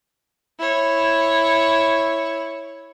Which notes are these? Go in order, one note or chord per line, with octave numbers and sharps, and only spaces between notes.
E4 C#5